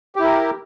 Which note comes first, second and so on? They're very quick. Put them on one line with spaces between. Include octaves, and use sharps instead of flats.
G4 E4 A#4